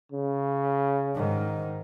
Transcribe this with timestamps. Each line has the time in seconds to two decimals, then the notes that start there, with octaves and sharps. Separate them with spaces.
0.12 C#3
1.14 G#2 D#3